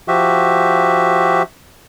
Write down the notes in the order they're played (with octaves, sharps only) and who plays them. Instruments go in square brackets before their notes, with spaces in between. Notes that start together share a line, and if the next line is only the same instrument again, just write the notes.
[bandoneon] F3 F#4 G4 E5